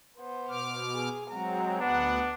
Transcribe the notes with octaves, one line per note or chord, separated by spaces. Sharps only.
B3 C5
B2 D6 F6
G#4
F#3 G#3 C4 F#4 A#5
D2 B3 D4 F#5